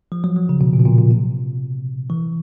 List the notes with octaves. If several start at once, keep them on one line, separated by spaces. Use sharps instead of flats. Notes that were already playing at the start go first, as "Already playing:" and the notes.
F3
F#3
F#3
C#3
B2
A#2
B2
A#2
A#2
C3
E3